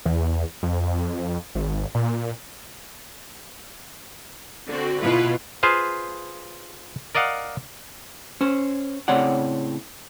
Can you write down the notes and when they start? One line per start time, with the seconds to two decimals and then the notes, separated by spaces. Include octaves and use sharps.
0.06 E2
0.63 F2
1.55 G#1
1.95 A#2
4.68 D3 C4 F#4
5.01 B2 E4 F4 B4
5.63 F4 G#4 B4 C5 F5
7.15 A#4 D5 D#5 F5 F#5
8.41 C#4 C5
9.08 A2 C#3 C4 C#5 D5 F#5